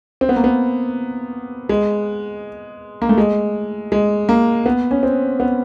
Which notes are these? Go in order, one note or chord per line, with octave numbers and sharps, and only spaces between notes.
C4
B3
A#3
B3
G#3
A#3
A3
G#3
G#3
A#3
B3
C#4
C4
B3